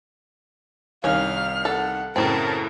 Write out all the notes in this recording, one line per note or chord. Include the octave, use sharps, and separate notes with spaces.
C2 D#3 C#4 F5 F6
A4 F#5
F#2 A2 C#3 C4 A#4 A5